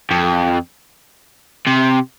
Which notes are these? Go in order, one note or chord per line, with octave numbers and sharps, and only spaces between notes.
F2
C3